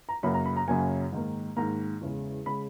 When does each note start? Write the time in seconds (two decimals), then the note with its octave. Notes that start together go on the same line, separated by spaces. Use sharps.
0.09 A#5
0.23 F#2 C#3 F#3 A#3 B5
0.34 A#5
0.45 B5
0.56 A#5
0.68 F#2 C#3 F#3 A#3 G#5
1.12 G#2 D#3 A#3
1.56 G#2 D#3 A#3 A#5
2.01 E2 C#3 G#3
2.46 C#3 G#3 B5